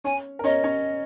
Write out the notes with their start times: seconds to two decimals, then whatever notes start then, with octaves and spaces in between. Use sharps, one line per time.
0.04 C#4 C#5 G#5
0.39 A#4
0.44 C#4 C#5 D#5
0.64 C#4 C#5